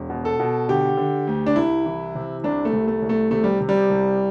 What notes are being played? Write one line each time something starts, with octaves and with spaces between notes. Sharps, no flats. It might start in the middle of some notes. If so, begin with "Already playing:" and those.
Already playing: E1
B2
A4
B2
D3 G4
D3
D2
D4
C2 E4
E3
C3
C2 D4
A3
C2
A3
C2
A3
C3 A3
G3
C3
G3
C2